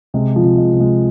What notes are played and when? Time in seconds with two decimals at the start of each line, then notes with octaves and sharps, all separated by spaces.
0.14 C3 G#3
0.36 F3
0.44 C3
0.58 G#3
0.73 C3
0.80 G#3